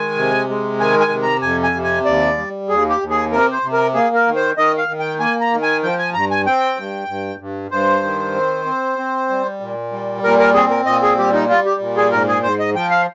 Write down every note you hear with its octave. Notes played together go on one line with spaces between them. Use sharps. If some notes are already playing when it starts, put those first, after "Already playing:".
Already playing: D#3 G#3 G#5
C3
G#3
D#3 G#5
G#5
C3
A#5
F2 G#5
G#5
C3
G#5
D#2 D5
G3
D#2 G#4
G4
D#2
G#4
C3 A#4
C5
C3
A#4
A#3 G#4
A#4
D#3
C5
D#3 D#5
F5
D#3
G5
A#3 G#5
A#5
D#3
G#5
F3 G5
G#5
G2 A#5
G#5
C4 G5
G2
G2
G2
G2 C5
D#3
C4
C4
C4
G3
A#2
G3
A#2 A#4
A#4
C4 G#4
A#4
A#2 D#5
G#4
G3 G4
D#4
G3 F4
G4
A#2
G#4
G#2 A#4
G#4
G#2 C5
D#5
F3 G5
F5